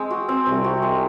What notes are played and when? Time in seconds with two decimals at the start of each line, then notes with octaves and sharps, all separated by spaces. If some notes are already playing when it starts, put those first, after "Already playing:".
Already playing: G#3 C4
0.10 F#4
0.29 C4
0.46 C2 C3 C4
0.64 F#4
0.82 G#3